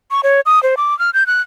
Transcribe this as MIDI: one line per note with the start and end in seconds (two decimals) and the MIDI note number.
0.11 0.21 85
0.23 0.41 73
0.46 0.62 87
0.63 0.75 72
0.77 0.97 86
0.99 1.10 89
1.14 1.27 91
1.27 1.42 90